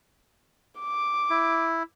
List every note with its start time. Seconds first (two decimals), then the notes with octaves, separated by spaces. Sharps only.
0.80 D6
1.30 E4